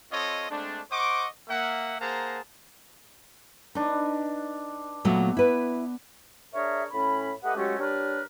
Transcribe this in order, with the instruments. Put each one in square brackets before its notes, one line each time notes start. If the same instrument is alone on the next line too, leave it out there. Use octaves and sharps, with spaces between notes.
[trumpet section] C4 F4 A4 C#5 D#5
G#3 A3 C4 D4
C5 D#5 F#5 C#6 D6
A#3 E5 F#5
A#3 G#4 C5 F#5 A5 A#5
[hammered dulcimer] D4 B4 [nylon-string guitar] D#4
[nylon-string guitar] A#2 F#3 A3 [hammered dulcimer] B3
[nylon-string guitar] E4 B4
[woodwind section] D4 G#4 A#4 C#5 E5
A2 C#4 B5
A3 G4 B4 D#5 F#5
F#3 G#3 A3 C#4 G4
G3 D4 A#4 B4 C#5